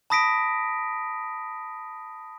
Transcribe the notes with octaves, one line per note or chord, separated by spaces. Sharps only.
A5 B5 D#6 A#6 B6 D7